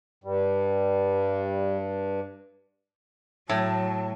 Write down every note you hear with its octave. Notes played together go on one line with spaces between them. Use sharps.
G2 G3
A2 F#3 A5